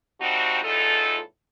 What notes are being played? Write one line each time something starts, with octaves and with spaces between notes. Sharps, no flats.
F3 G3 C4 D#4 F#4
E2 A2 D#4 F4 A4